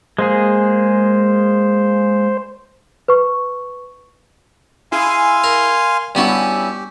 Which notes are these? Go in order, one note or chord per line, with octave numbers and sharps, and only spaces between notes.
G#3 A#3 G#4 C5
B4 C#6
E4 G#4 F5 G#5 C6
A#4
G2 B3 C#4 E4 F#4 G4